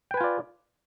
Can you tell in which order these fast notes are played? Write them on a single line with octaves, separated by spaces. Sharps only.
G5 B4 G#5 F4 D5